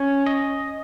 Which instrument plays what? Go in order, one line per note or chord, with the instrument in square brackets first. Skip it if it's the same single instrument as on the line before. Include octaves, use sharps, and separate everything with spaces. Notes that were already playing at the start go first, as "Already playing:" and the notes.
Already playing: [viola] C#4 [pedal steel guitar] C#5
[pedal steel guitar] D#5